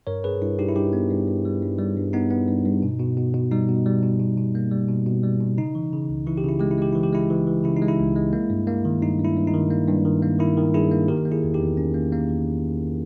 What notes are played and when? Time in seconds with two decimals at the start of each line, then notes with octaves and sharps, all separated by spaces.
0.07 G2 A#4 C#5
0.24 G2 G#4 B4
0.42 G2 E4
0.59 G2 D#4 G4
0.68 E4
0.76 G2 D#4 G4
0.93 B3
1.10 G2
1.27 G2
1.45 G3
1.62 G2
1.79 G3
1.97 G2
2.13 B3 D#4
2.31 B3
2.48 G2
2.66 G2
2.82 B2
3.00 B2
3.17 B2
3.34 B2
3.51 G3 D#4
3.69 B2
3.86 G3
4.03 B2
4.20 B2
4.38 B2
4.55 A#3
4.71 G3
4.89 B2
5.06 B2
5.23 G3
5.40 B2
5.57 C#3 D#4
5.75 E3
5.92 C#3
6.09 C#2
6.27 E3 E4
6.38 G4
6.44 C#3 E4
6.59 G#3 G4
6.71 E4
6.78 G#3 G4
6.92 E3 E4
7.03 G4
7.12 G#3 E4
7.30 E3
7.47 E3
7.64 C#3 E4
7.77 D#4
7.82 G#3
7.88 E4
7.99 C#2
8.16 G#3
8.33 A#3
8.50 G2
8.67 A#3
8.85 D#3
9.02 G2 D#4
9.19 G2
9.25 E4
9.36 G2
9.47 D#4
9.54 D#3
9.70 A#3
9.88 G2
10.05 D#3
10.22 A#3
10.39 D#3 E4
10.57 D#3
10.74 G2 E4 G#4
10.91 A#3
11.08 D#3 G4 A#4
11.25 A#3
11.32 E4 G#4
11.43 E2
11.54 D#4 G4
11.60 E2
11.77 C#4
11.94 A#3
12.12 A#3
12.29 E2